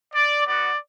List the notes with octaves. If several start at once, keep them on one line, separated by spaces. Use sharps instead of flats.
D5
B3 F#4 D5